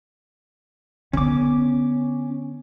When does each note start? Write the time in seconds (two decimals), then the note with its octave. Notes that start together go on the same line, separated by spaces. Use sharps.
1.13 D3 B3 C#4 D6